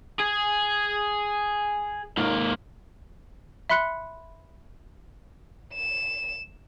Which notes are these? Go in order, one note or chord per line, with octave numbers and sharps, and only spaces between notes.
G#4
G#2 A#3
E5 B5 C6 F#6 C#7
E7